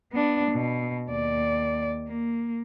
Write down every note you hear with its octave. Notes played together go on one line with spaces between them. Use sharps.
B3 D4
B2
D#2 D5
A#3